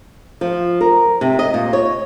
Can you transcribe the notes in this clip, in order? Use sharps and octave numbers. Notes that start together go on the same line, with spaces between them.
F3
A#4
C3
D#5
A#2
C#5